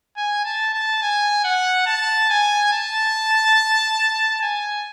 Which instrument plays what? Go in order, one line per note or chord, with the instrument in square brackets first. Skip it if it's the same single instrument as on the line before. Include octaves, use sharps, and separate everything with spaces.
[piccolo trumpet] G#5
A5
A5
G#5
F#5
A5
G#5
A5
G#5